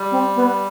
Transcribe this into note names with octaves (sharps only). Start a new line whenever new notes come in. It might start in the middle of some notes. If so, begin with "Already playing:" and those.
Already playing: G3
C4
B3